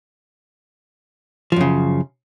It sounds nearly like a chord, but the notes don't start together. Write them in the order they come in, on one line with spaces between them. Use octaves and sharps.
F3 F#2 C#3